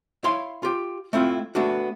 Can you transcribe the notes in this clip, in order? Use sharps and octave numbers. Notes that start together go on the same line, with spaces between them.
E4 C#5 F5 C6
F4 G4
A3 C4 E4 F4
A3 B3 D4 F#4